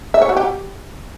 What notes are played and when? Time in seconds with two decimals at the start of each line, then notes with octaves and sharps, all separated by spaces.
0.14 E5
0.22 C#5
0.29 F#4
0.37 G4